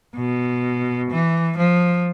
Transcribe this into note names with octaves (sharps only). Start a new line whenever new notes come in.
B2
E3
F3